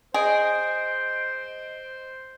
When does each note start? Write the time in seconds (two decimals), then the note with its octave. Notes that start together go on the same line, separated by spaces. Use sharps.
0.14 G#4 C5 D#5 D7